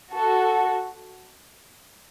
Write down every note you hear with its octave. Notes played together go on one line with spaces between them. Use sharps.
F#4 A4